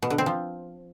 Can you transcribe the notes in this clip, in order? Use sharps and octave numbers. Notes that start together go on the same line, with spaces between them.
B2
D3
C4
F3